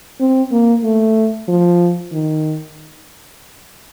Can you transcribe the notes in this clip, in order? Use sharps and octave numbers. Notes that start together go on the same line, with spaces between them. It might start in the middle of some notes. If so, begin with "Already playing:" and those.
C4
A#3
A3
F3
D#3